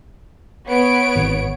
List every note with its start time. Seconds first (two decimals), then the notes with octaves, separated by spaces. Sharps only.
0.67 B3 C#5 D7
1.16 G#1